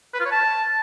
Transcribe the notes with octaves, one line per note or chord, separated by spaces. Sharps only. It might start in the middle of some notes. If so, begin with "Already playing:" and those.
B4
F4
C#5
A5